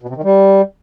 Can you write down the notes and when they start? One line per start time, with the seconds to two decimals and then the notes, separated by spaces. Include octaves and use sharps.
0.02 B2
0.09 C3
0.16 D#3
0.23 G3